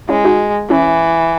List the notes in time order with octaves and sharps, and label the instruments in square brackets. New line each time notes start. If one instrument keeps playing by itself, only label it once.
[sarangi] G#3 [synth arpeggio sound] C#4 E4
[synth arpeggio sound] D#4 F#4
[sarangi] E3 [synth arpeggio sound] C#4 E4